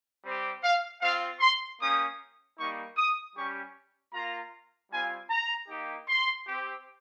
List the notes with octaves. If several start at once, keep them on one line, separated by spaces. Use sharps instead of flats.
G3 C4 G4
F5
C4 F4 F5
C6
A#3 C#4 G4 D#6
G3 A#3 D#4 C#6
D#6
G3 C#4 G4 C#6
A#3 F4 A#5
G3 C4 F4 G#5
A#5
A#3 D#4 G4
C6
C4 G4